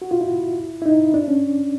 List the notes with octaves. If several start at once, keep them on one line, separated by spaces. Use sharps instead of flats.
F#4
F4
E4
E4
D#4
D4
C#4